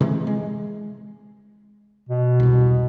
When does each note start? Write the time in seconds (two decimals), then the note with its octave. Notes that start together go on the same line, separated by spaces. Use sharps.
0.01 C3 E3 G#3
0.27 G#3
2.09 B2
2.40 E1 C2